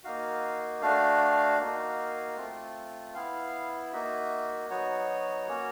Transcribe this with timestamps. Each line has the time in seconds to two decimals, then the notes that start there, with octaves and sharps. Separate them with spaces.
0.04 A#3 D#4 F#4 F5
0.81 A3 D4 F#4 F5
1.59 A#3 D#4 F#4
2.37 A3 C4 F4
3.14 B3 E4 F5
3.93 A#3 D#4 F#4 E5
4.70 F#3 B3 D#4 F#4 C#5
5.48 A#3 C#4 F#4